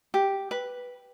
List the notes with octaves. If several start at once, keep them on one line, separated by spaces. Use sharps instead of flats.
G4
B4